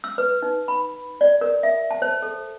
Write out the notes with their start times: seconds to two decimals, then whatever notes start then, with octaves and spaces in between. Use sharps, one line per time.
0.04 E6
0.18 B4
0.42 D#4
0.68 B5
1.21 D5
1.41 A#4
1.63 E5
1.91 A5
2.02 C5
2.22 A4